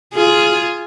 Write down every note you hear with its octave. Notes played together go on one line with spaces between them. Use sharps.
F4 G#4